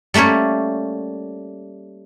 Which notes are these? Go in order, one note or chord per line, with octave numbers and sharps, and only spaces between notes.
G3 A3 A#3 C#4 C#5